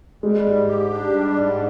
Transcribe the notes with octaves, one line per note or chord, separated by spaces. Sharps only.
G3 G#3
G#2
G4
D4
G3
G#2